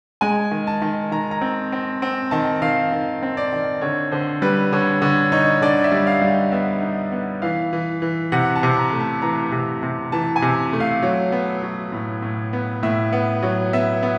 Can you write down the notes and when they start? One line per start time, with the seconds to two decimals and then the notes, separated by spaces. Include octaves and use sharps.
0.21 G#3 G#5
0.51 D#3
0.67 A5
0.82 D#3
1.12 D#3 A#5
1.31 A#5
1.41 C4
1.72 C4
2.02 C4
2.31 D#3 A5
2.62 D#3 F5
2.92 D#3
3.23 C4
3.37 D5
3.53 D#3
3.81 D3 C#5
4.11 D3 C5
4.42 G3 B4
4.72 D3 C#5
5.02 D3 C#5
5.32 D#4 C#5
5.62 D3 D5
5.84 E5
5.92 G3
6.07 F5
6.22 G3
6.30 G5
6.52 B3 E5
6.82 D#4
7.12 B3
7.42 E3 F5
7.73 E3
8.02 E3
8.32 C3 F#5
8.56 A5
8.63 C3
8.77 A#5
8.93 A3
9.00 A5
9.22 E3 A#5
9.52 C3
9.83 C3
10.12 E3 A5
10.36 G#5
10.42 C3
10.73 A3
10.80 F5
11.03 F#3
11.32 B3
11.62 F#3
11.92 A2
12.22 A2
12.53 B3
12.83 A2 E5
13.13 B3
13.43 F#3
13.73 B3 E5
14.03 B3